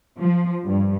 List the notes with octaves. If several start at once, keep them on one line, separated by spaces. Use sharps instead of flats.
F3
G2